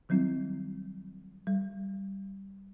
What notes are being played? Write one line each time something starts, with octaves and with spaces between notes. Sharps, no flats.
D#3 F#3 G3 C4 E4
G3